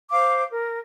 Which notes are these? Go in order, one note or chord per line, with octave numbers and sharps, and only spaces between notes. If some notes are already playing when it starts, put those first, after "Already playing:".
C5 F5 D6
A#4